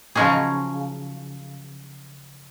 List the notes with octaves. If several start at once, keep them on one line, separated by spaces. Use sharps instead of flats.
C#3 F3 F#3 C#4 D#4 G#4